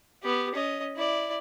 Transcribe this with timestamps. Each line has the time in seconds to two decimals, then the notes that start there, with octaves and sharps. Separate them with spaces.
0.23 B3 G4
0.54 C#4 D#5
0.96 E4 D5